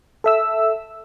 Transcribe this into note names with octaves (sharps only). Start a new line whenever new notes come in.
A4 E5 E6